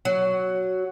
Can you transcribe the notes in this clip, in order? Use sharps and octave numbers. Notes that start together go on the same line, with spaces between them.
F#3